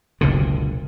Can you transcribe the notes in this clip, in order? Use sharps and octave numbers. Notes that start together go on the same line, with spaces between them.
F#1 C#2 B2 D3